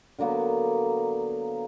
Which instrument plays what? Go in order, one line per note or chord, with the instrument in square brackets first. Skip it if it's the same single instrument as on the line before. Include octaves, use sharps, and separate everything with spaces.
[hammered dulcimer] D3 F#3 A#3 B3